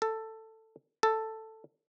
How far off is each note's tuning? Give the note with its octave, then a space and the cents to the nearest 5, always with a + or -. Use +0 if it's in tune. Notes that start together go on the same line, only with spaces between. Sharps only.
A4 +10
A4 +5